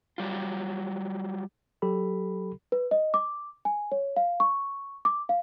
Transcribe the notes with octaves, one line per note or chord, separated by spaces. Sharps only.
F#3 G3 F4
F#3 G4 A4 B5
B4
D#5
D6
G#5
C#5
F5
C#6
D6
F5